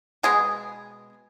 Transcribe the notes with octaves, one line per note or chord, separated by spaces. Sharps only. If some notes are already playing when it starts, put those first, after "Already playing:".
B2 G#3 B3 G#4